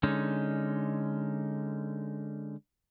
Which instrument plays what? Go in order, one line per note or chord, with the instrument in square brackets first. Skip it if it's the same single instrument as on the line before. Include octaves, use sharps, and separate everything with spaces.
[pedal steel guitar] D3 G#3 C#4 D#4